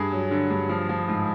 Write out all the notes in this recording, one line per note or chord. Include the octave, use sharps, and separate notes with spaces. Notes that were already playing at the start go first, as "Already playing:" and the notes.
Already playing: G2 G#4
F#3
D3
G2
F3
F3
G#2